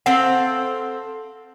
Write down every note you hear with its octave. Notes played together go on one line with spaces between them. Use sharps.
C4 A4 F5 F#5